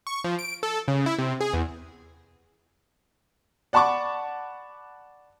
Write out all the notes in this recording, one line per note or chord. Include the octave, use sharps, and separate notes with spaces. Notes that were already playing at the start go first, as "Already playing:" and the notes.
C#6
F3
D7
A4
C#3
E4
C3
G#4
E2
D5 F#5 A5 B5 C#6 D6